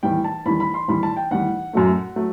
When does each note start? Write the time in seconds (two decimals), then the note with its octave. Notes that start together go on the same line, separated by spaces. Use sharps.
0.03 E2 D#3 G3 G5
0.24 A5
0.46 E2 D#3 G3 B5
0.60 B5
0.74 C6
0.88 E2 D#3 G3 B5
1.03 A5
1.16 G5
1.31 E2 D#3 G3 F#5
1.73 F#2 F#3 A3
2.16 F#3 A3